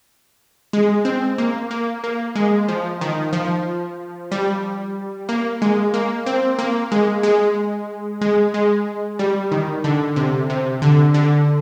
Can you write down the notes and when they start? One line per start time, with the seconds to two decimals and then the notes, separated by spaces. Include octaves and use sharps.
0.73 G#3
1.05 C4
1.38 A#3
1.71 A#3
2.04 A#3
2.35 G#3
2.68 F3
3.01 D#3
3.33 F3
4.32 G3
5.29 A#3
5.62 G#3
5.94 A#3
6.26 C4
6.59 A#3
6.92 G#3
7.23 G#3
8.21 G#3
8.54 G#3
9.19 G3
9.51 D#3
9.84 D3
10.16 C3
10.50 C3
10.82 D3
11.14 D3